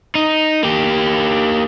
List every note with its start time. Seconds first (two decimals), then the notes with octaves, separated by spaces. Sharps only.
0.15 D#4
0.63 A#3 G4